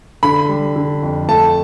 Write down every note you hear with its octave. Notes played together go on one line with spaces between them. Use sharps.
D3 B5
G3
D3
F2
A3 A5